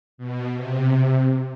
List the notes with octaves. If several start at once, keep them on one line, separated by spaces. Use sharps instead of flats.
B2
C3